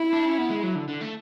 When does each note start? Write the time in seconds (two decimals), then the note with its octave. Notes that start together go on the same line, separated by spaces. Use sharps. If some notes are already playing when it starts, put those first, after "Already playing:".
Already playing: E4
0.13 D4
0.25 C#4
0.38 B3
0.50 G#3
0.63 F#3
0.75 D3
0.88 D3
1.01 A3